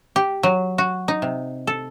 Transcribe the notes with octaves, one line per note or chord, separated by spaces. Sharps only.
G4
F#3
F#4
D#4
C3
A4